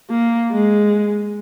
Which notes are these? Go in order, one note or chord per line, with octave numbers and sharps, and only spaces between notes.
A#3
G#3